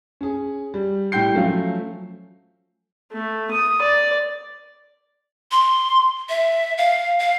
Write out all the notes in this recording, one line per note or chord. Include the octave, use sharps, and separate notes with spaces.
C#4 G#4
G3
A2 G3 G5 G6 C7
F3 F#3 A3 C#4 F4 F5
A3
D#6
D5
C6
E5
F5
F5